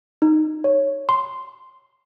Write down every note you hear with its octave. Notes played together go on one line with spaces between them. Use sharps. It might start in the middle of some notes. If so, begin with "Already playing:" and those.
D#4
C#5
C6